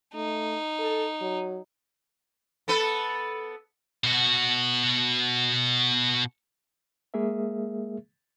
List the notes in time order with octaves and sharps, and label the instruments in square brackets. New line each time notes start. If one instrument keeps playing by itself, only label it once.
[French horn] A3 [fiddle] D#4
[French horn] A4
F#3
[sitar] B3 A4 B4
[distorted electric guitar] B2 F#4
[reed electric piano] G#3 A#3 G#4 A#4 E5